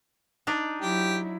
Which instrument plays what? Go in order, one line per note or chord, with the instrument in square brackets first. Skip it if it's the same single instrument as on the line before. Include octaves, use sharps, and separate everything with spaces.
[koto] D4 D#4
[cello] F#3 E4 [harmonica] G4